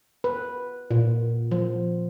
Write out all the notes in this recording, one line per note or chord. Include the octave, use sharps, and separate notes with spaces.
B4
A#2
F3